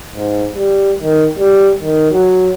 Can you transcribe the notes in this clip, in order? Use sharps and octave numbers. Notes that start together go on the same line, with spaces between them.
G#2
G3
D#3
G3
D#3
F#3